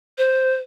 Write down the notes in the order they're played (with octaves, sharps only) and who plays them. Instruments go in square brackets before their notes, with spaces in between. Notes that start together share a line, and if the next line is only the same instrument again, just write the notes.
[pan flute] C5